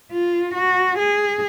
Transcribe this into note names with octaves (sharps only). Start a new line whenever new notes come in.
F4
F#4
G#4